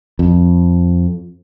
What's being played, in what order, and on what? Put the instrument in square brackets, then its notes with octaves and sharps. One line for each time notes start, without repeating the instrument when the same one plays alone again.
[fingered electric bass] F2